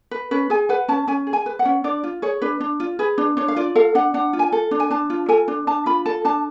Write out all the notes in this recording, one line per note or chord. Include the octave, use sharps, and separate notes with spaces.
B4
C#4 B4
G#4 G#5
B4 F#5
C#4 A5
C#4 G#5
G#4
G#5
B4
F#5
C#4
D4 D5
F4
G#4 C#5
D4 B4
D4
F4
G#4 B4
D4
D4 C#5
F5
F4 D5
A4 F5
D4 F#5
D4 F#5
F4
G#5
A4
D4
G#5
D4 A5
F4
A4 G#5
D4
D4 A5
F4 B5
A4 A5
D4 A5